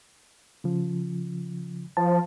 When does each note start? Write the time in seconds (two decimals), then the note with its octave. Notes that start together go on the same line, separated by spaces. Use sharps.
0.64 C#3 F3
1.97 F3 A5